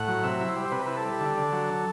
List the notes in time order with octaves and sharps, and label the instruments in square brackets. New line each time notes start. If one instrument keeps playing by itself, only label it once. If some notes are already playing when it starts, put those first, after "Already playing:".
Already playing: [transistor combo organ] A2 F#5
F#3
C3 E5
E4
C5
G3
C5
C3 B4
E4 B4
A4
G3
D3
D3
F#3